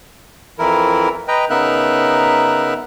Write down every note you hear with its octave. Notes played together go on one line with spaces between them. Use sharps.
F2 E3 E4 A#4
B4 D#5 G5 A#5
C#3 B3 D#4 A#4 E5 F#6